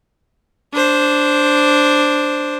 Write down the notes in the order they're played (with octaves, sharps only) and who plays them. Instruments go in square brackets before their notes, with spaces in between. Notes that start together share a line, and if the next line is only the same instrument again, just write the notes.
[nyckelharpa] D4 C5